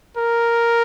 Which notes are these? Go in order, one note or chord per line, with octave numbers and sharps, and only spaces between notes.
A#4